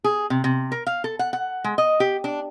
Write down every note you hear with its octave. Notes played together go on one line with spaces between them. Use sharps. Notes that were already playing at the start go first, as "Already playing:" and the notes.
G#4
C3
C3
A#4
F5
A4
F#5
F#5
G#3
D#5
G4
D4